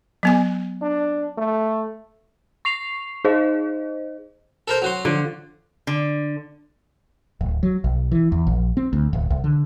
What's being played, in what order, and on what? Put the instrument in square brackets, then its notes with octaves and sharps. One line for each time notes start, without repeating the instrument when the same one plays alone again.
[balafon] F#3 B3 G#5
[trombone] D4
A3
[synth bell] C#6 C7 F7
D#4 G#4 C5 D#5
[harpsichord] A4 A#4 C5
F#3 F#4 C6
[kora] D3 F3
[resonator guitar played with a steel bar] D3
[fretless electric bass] D1
F#3
B1
E3
E2
A#1
C4
D2
D1
C2
D3